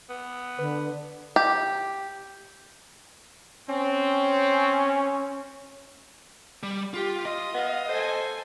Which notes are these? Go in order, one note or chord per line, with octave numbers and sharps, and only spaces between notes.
B3
D3 B4
G4
C4 C#4
G3
F4 G4
F4 D#5
B3 F5
A4 C5 G#5